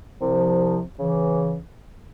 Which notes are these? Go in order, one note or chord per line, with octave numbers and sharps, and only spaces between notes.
C2 C3 F3
C#3 E3